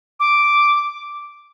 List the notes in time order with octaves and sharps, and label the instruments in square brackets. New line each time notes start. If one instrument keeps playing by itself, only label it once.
[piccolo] D6